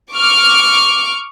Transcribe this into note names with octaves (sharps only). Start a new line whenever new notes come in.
C#6 D6 F6